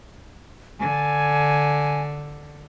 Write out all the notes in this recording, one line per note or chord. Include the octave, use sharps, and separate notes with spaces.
D3 G#5